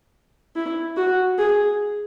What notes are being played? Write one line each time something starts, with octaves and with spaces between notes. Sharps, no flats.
E4
F#4
G#4